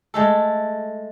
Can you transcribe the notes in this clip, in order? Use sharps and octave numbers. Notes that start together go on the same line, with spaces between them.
G#3 A3 A4